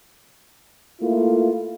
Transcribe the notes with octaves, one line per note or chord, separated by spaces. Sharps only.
A3 A#3 E4 F4